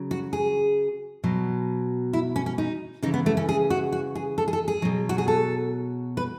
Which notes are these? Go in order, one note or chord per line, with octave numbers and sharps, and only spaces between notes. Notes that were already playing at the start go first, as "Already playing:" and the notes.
Already playing: C#3 F#3
F#4
G#4
B2 F#3
E4
C#4
C#4
D#4
C#3 E3 D#4
B3
A3
C#4
G#4
F#4
F#4
G#4
A4
G#4
A4
G#4
B2 F#3
F#4
G#4
A4
B4